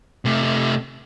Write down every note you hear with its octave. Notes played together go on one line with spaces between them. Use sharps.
C3 A3